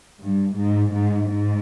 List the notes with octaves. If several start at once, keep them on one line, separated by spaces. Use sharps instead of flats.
G2
G#2
G#2
G#2